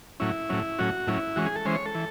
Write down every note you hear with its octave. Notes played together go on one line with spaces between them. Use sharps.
A2 F#3 C#4 E4
A2 F#3 C#4
A2 F#3 C#4 F#4
A2 F#3 C#4 E4
E3 G#3 C#4 F#4
G#4
A4
E3 G#3 C#4 C5
C#5
A4
E3